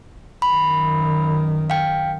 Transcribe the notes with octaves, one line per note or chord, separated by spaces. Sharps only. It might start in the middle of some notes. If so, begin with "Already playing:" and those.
F#2 D#3 B5
F5 G5